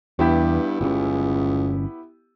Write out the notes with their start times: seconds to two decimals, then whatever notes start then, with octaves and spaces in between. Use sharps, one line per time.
0.19 E2 G2 B3 E4 G4
0.81 G1 C#2 A#2 C#4